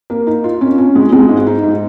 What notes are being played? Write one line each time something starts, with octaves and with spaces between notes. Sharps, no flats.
A#3
D#4
F4
C#4
C#4
G#3
G#3
G#2
D#4
G#2